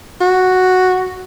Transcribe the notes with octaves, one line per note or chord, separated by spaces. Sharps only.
F#4